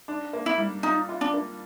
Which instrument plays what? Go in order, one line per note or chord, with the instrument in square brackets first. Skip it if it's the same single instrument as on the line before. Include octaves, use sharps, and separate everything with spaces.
[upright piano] D4
A#3
[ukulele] E4
[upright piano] G3
[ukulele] D#4 [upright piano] F4
[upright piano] F4
[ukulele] D4
[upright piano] A#3